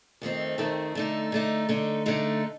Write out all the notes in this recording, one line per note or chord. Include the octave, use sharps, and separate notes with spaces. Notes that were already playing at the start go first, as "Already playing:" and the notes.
F2 D#3 A3 C4
F2 D#3 A3 C4
D3 A3 D#4
D3 A3 D#4
D3 A3 D#4
D3 A3 D#4